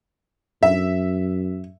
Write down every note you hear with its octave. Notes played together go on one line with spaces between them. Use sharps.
F#2 E5